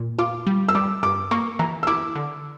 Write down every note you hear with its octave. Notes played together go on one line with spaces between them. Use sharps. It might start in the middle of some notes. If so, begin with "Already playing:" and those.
Already playing: A#2
F4 D6
G3
E6
G3 D6
G2 D6
A#3 C#6
E3 A#5
E6
E4 D6
D3